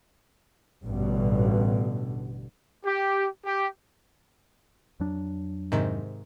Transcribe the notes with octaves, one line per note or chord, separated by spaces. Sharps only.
A1 G2 B2 D3
G4
G4
F2 F#3 D4
G#2 C3 D#3